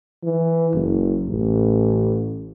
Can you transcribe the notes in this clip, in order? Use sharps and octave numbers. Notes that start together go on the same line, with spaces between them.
E3
F#1
A1